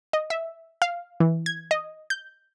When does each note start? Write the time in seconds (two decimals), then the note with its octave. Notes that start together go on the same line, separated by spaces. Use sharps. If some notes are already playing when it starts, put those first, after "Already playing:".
0.13 D#5
0.30 E5
0.82 F5
1.20 E3
1.46 G#6
1.71 D#5
2.10 G6